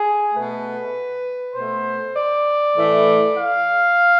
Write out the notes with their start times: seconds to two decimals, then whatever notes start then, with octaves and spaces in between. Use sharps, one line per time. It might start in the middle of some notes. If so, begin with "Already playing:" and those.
Already playing: G#4
0.35 B2 A3 B4
1.55 B2 A3 C5
2.16 D5
2.75 A2 E3 A3
3.36 F5